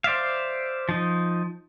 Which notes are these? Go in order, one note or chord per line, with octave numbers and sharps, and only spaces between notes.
C5 D5 E5 F5
F3 D#4